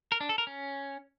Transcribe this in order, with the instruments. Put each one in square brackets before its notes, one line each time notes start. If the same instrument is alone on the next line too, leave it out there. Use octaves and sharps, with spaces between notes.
[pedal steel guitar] A#4
D4
A4
A#4
C#4